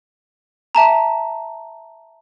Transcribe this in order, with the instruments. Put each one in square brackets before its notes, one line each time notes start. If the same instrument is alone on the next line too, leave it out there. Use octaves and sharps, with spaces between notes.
[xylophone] E5 A5 A#5